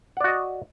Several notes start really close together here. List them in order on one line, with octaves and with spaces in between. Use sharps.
F#5 D5 F#4 D#5